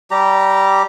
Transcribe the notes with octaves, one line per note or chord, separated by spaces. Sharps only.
G3 G4 A#5